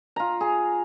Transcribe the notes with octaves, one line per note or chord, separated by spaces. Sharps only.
F4 A#5
G#4